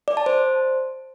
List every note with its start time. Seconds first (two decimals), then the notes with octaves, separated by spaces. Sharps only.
0.08 D5
0.17 A5
0.26 C5